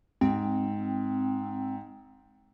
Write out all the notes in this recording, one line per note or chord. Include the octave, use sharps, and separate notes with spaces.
G#2 C4